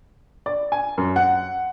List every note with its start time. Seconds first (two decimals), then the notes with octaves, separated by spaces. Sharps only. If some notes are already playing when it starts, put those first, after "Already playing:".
0.46 D5
0.72 G#5
0.98 F#2
1.16 F#5